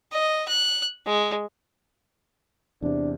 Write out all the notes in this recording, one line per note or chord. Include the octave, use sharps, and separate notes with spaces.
D#5
F#6
G#3
E2 C3 D4